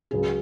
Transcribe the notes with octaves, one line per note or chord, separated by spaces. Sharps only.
C#2 C#3 F#3 G#4